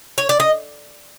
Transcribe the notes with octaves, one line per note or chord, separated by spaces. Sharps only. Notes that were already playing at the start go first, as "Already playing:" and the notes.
C#5
D5
D#5